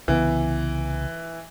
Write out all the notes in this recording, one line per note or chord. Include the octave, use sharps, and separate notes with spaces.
C2 C#3 E3 B3